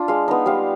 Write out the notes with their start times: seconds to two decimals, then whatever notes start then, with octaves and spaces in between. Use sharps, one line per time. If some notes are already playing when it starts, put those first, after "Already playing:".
Already playing: D4 F4
0.08 G#3 F5
0.28 B3 D#4
0.46 G3 F5